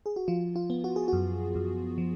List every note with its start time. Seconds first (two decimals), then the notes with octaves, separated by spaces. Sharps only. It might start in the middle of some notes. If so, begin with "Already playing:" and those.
0.06 G#4
0.16 F#4
0.28 F3 F4
0.56 F4
0.70 B3
0.84 F#4
0.96 G#4
1.08 F#2 F#4
1.55 F#2
1.98 F3